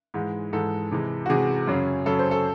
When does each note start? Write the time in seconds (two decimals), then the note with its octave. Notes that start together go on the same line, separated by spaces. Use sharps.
0.14 G#2 E3 G#3
0.53 G#2 E3 G#3 A4
0.91 C3 E3 G#3
1.26 F#4
1.30 C3 E3 G#3 G#4
1.67 F#2 C#3 F#3
2.06 F#2 C#3 F#3 A4
2.19 C5
2.31 A4